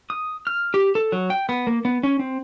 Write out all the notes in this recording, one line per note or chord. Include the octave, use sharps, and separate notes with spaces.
D#6
F6
G4
A4
F#3
G5
B3
A#3
B3
C#4
C4